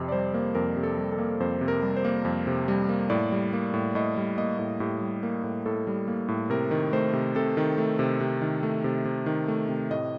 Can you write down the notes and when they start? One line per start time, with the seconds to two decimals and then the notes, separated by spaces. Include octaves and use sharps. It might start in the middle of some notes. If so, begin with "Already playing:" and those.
Already playing: F2 C3 D#5
0.08 D5
0.12 G3 C5
0.34 A#3
0.55 F2 A#4
0.77 C3
0.83 A4
0.98 G3
1.12 A4
1.18 A#3
1.40 F2 C5
1.61 C3
1.68 A#4
1.82 G3
1.96 C5
2.05 A#3
2.25 F2
2.47 C3
2.68 G3
2.89 A#3
3.10 A2 D5
3.32 G3
3.53 A#3
3.74 A2
3.95 A2 D#5
4.17 G3
4.38 A#3 D#5
4.59 A2
4.80 A2 G4
5.01 G3
5.23 A#3
5.43 A2
5.66 A2 A4
5.87 G3
6.08 A#3
6.28 A2
6.50 C3 A#4
6.71 D#3
6.93 A3 C5
7.13 C3
7.35 C3 A4
7.57 D#3
7.78 A3
7.99 C3
8.21 C3
8.42 D#3
8.63 A3
8.84 C3
9.05 C3
9.26 D#3
9.48 A3
9.68 C3
9.91 A2 D#5